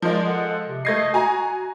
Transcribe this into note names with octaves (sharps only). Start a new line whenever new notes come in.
F3 G#3 A#4 D5
A4 F#5
C3
A3 D#5 G#6 C7
F#4 G#5 A#5